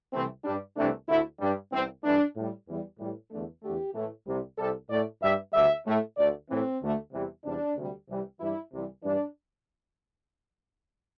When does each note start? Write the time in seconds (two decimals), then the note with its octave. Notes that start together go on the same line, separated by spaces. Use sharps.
0.13 C2 C3 E3 A3 C4
0.45 G2 G3 D4
0.77 C2 C3 E3 A3 D4
1.08 D2 D3 A3 E4
1.40 G2 G3 D4
1.71 C2 C3 E3 C4
2.04 G2 E3 A3 D4
2.35 A2 G3
2.67 E2 E3 G3
2.99 A2 E3 G3
3.31 E2 D3 A3
3.63 E2 D3 A3 G4
3.94 A2 E3 A3
4.26 C2 C3 G3
4.57 C2 C3 G3 A4
4.90 A2 A3 D5
5.22 G2 G3 E5
5.53 D2 D3 G3 E5
5.86 A2 A3
6.17 D2 D3 A3 D5
6.49 A2 E3 A3 C4
6.81 D2 D3 A3
7.12 E2 C3 E3 G3
7.44 E2 C3 G3 D4
7.76 D2 C3 G3
8.08 C2 C3 E3 G3
8.40 G2 E3 G3 E4
8.71 C2 C3 E3 G3
9.03 G2 E3 G3 D4